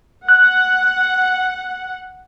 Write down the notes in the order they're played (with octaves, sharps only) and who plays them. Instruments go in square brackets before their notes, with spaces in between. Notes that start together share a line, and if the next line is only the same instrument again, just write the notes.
[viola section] F#5 [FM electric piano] F#6